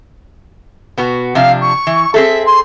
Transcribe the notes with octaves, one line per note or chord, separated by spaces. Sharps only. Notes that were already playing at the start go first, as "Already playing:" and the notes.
B2 B3 F#4
C3 F3 D4 F5
C#6
E3
C4 G#4 A4 E5
C6